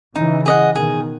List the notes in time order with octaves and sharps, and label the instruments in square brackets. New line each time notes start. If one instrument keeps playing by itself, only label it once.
[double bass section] C#3 E3 [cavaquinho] D#4
[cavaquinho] G#4 D#5 F#5
[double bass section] B2 D#3 [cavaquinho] G#4